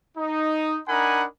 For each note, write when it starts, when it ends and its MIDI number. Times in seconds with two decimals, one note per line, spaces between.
0.17 0.77 63
0.88 1.25 62
0.88 1.25 63
0.88 1.25 70
0.88 1.25 78
0.88 1.25 80
0.88 1.25 83